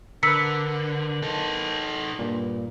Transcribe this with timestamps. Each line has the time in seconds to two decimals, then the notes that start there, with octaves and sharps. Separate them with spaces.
0.23 D3 A#4 B4 E6 B6 C#7
1.22 D#4 A4
2.19 G2 A#2